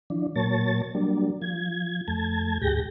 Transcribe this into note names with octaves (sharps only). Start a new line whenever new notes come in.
E3 F3 D4
A#2 F#3 A#3 C#5 A5 A6
F#3 G3 A#3 D4
F3 G#6
F2 A3 A5 G#6
D2 G#2 G4 G#4 G6 A#6